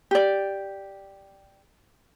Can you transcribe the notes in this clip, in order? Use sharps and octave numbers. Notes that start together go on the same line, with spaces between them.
G4 D5